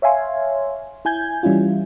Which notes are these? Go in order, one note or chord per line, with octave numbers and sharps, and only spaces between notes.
C#5 E5 F5 G#5 C6
E4 G#5 G6 G#6
E3 G3 C#4 E4 F4